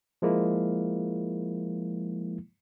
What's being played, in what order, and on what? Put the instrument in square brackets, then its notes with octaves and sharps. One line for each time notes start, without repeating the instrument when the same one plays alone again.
[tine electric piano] F3 G#3 A#3 E4